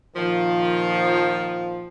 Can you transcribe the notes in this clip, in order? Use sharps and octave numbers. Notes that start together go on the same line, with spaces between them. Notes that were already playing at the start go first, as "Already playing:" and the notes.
A#2 D#3 F3